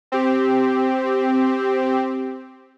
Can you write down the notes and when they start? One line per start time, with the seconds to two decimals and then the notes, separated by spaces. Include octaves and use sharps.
0.12 C4 G4